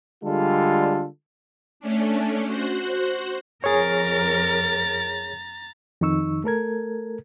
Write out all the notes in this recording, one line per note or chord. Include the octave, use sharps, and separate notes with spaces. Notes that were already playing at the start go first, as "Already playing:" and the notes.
D3 G3 G#3 F4 A4
A3 C#4 D4
F#4 C5 F#5
F2 G#4 A#4 C#5 A#5 A6
F2 D#3 D#4 C#6 E6
A3 A4 A#4 G#6